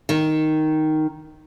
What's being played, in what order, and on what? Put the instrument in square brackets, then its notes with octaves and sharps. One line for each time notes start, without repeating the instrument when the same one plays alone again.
[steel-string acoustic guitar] D#3